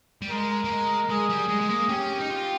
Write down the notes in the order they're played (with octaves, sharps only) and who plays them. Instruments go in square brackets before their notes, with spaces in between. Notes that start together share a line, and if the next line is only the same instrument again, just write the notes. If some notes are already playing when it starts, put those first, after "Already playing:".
[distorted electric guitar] G3
[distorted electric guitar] G#3 [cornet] A#4
[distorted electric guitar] A#3
G#3
[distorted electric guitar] G#3 [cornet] G#4
[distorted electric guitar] G3
G#3
G#3
A#3
[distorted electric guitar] C#4 [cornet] G4
[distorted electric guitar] D#4
F4